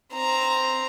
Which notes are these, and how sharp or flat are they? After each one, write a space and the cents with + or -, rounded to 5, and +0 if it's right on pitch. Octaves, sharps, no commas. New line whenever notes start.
C4 +0 A#5 +0